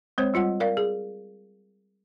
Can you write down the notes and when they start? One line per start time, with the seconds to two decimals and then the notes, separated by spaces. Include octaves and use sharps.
0.18 G#3 C4 C5 C#5
0.34 G3 F4 D#5 F#5
0.60 A#4 D5 F5
0.77 G#4